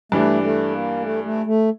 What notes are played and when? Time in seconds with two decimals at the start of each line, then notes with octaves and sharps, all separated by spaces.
0.12 G2 E3 G3 A3 D4
0.42 A3
0.71 A#3
1.02 A3
1.24 A3
1.46 A3